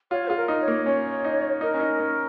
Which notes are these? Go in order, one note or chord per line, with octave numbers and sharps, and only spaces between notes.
F4 C#5
F4 G#4
A#4
D#4
C#5
A#3
C#4 C#5
D#4
D#4 A#4
C#4
D#4
C#4